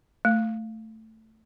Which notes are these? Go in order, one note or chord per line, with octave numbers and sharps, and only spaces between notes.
A3